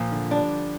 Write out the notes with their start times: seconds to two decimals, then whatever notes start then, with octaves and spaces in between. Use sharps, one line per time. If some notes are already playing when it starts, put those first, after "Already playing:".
Already playing: A#2 F3
0.12 D3
0.31 G3 D4